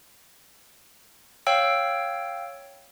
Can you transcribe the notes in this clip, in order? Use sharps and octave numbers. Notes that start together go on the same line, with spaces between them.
C#5 F5 G5 E6